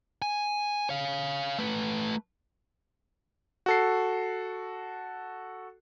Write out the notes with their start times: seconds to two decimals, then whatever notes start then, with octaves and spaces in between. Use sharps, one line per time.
0.22 G#5
0.89 C#5 F5
1.59 A3 B4
3.66 F#4 A4 C7